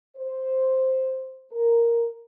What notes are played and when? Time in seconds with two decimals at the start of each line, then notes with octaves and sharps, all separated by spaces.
0.17 C5
1.52 A#4